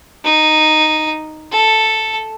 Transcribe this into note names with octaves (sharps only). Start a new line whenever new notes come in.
D#4
A4